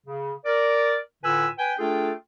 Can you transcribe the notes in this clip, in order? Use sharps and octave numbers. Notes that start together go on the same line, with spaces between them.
C#3
A#4 D5
A2 D3 F4 B4 G#5 E6
B4 G5 G#5
A3 D4 F4 G#4 A4 G5